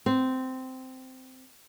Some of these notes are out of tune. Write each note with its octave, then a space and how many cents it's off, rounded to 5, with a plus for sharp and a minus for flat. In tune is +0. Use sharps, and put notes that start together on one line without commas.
C4 -10